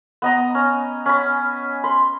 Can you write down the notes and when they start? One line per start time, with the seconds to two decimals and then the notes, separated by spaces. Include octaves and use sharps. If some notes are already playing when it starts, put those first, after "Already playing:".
0.22 B3 D#5 A#5
0.55 C#4
1.06 C#4 B5
1.84 B5 C6